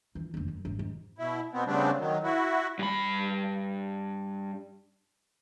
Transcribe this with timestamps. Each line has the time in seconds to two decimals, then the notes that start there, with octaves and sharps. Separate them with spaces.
0.15 E3 F4
0.34 F1 D#2
0.48 F#2
0.65 G#1
0.79 F2 G#2
1.19 B2 E4
1.53 B2 B3 C4
1.66 C#3 G3 A3 B3 C4 D4
1.98 D#3 F#3
2.24 E4 F#4
2.79 G2 B5